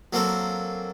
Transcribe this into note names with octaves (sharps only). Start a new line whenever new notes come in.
F#3 A#3 C4 A4